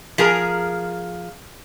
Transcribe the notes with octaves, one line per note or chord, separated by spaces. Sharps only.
F3 G#4 A#4